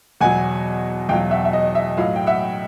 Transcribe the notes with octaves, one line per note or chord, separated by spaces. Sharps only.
E2 B2 F#3 F#5 G#5
E2 B2 F#3 F5 G5
E5 F#5
E5
D#5
E5
A2 F#3 D#5 F5
G5
E5 F#5